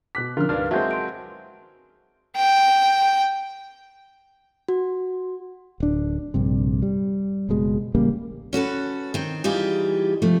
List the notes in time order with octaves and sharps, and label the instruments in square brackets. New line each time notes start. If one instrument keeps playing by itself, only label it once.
[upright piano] B2 F#6 B6 [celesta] D6
[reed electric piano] D3 F3 C#4 [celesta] D4 [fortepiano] F4 F6 [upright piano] A#4
[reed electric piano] C#2 F6 [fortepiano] G2 D4 [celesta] D#4 B4 F5
[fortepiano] F#3 G#3 C4 [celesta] E5 [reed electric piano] A5 G6
[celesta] C6 D7
[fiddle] G5
[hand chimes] F#4
[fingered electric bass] D1 D4
A#1 G2 C3
G3
F#1 B2 G#3
A1 C#3 G3 A#3
[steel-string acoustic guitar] C#4 F#4 A4 B4
D#3 C4
E3 G3 D#4 F4 G4 G#4
C3 F3 A3